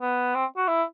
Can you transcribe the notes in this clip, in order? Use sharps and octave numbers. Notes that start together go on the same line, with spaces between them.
B3
C4
F#4
E4